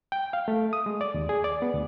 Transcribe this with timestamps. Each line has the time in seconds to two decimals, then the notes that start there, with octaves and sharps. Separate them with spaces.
0.12 G5
0.33 F5
0.48 A3
0.73 D#6
0.86 G#3
1.01 D5
1.14 D#2
1.29 G#4
1.44 D5
1.62 B3
1.74 D2